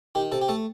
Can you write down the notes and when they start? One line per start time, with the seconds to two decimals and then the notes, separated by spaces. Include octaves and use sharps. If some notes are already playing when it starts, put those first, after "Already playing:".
0.15 D#3 G4
0.32 C3 A4
0.41 G4
0.48 A3 A4